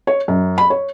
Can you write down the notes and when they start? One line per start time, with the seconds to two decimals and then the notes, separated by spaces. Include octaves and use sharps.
0.07 C#5
0.28 F#2
0.58 B5
0.70 C#5